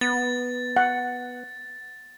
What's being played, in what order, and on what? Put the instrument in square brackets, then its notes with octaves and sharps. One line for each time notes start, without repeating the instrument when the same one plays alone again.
[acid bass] B3 [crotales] A6
[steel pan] F#5